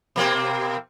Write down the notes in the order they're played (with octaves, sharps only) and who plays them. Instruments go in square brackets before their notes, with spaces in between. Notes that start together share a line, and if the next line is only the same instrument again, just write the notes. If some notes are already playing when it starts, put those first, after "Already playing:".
[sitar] B2 A#3 C4